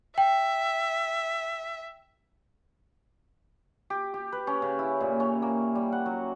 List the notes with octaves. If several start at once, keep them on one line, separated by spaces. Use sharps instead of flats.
E5 G5
G4
G4
B4
C#4
C#3
E4
A#2
C#4
A#3
G3
F#5
F#3